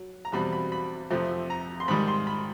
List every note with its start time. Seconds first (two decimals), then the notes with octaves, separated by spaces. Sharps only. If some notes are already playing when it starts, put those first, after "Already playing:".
Already playing: F#3
0.25 A#5
0.32 E2 B2 G3 C4 B5
0.53 B5
0.72 B5
1.11 F2 C3 F3 A3
1.50 A#5
1.80 C6
1.88 G#2 D#3 G3 B5
2.08 C6
2.27 B5